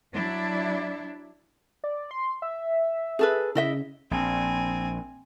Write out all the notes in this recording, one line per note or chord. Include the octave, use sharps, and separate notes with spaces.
F#3 D4 E4
D5
C6
E5
G#4 A4 B4
C#3 E4 D#5 E5
A#1 C4 G#5